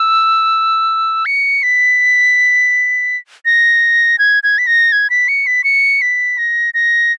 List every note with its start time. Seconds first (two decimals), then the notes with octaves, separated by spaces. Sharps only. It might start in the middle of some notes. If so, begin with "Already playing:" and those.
Already playing: E6
1.26 C#7
1.63 B6
3.45 A#6
4.19 G#6
4.43 G#6
4.58 B6
4.67 A#6
4.92 G#6
5.10 B6
5.28 C#7
5.47 B6
5.64 C#7
6.02 B6
6.38 A#6
6.74 A#6